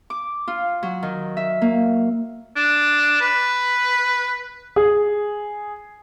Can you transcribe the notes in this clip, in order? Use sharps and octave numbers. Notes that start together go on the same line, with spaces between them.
D6
F4
F#3
D#3
E5
A#3
D4
B4
G#4